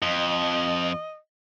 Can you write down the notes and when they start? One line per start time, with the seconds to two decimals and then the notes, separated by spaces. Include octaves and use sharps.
0.02 F2 D#5